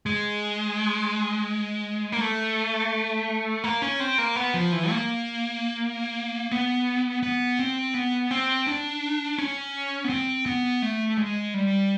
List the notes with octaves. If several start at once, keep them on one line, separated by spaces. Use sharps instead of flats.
G#3
A#3
A3
A#3
C#4
C4
A#3
B3
F3
E3
A#3
B3
B3
C4
B3
C4
D4
C#4
B3
C4
B3
A3
G#3
G3